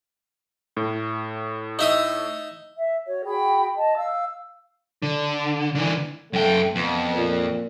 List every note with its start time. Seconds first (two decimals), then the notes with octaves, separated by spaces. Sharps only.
0.77 A2
1.79 D#4 E5 D#6
2.77 E5
3.06 F#4 C#5
3.25 F#4 G#4 G5 B5
3.77 D#5 A5
3.96 F5 E6
5.02 D3
5.75 D3 E3
6.33 F#2 A3 G5
6.75 F2 B3
7.15 A#2